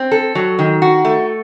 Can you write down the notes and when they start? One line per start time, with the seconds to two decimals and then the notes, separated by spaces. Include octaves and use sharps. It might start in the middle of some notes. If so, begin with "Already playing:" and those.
Already playing: C4
0.12 A4
0.35 F#3
0.59 D#3
0.82 F#4
1.05 A3